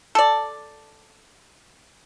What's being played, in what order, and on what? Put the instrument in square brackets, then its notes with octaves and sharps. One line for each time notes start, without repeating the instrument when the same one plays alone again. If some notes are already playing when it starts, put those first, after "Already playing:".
[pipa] A4 D5